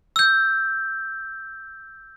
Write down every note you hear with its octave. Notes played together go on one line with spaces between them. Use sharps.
E6 G6